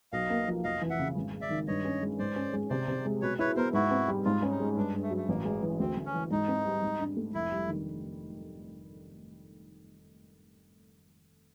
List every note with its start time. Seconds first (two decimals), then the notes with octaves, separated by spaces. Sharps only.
0.12 B1 D#5 F5
0.30 A#3
0.48 F3
0.64 F1 D#5 F5
0.81 E3
0.90 E5 F#5
0.99 C#3
1.16 G#1
1.33 G#3
1.41 D5 E5
1.50 D#3
1.68 G2 C#5 D#5
1.85 C#4
2.03 G#3
2.19 G#2 C5 D5
2.36 C#4
2.53 G#3
2.70 C3 C5 D5
2.88 C3
3.05 G#3
3.22 B2 B4 C#5
3.39 E4 B4 C#5
3.56 B3 A#4 C5
3.73 G#2 E4 F#4
3.91 C4
4.08 G3
4.25 G#2 F4
4.42 C#4
4.51 D#4
4.60 G#3
4.77 G2 D4
4.94 G2
5.02 A3
5.10 F#3
5.17 A3
5.28 A1 A#3
5.45 G#3
5.63 E3
5.80 D2 C4
5.97 D2
6.06 C#4
6.14 E3
6.31 G#2 D#4
6.48 C4
6.66 G3
6.82 G#2
7.00 D4
7.17 A3
7.34 F1 E4
7.52 G3
7.69 D#3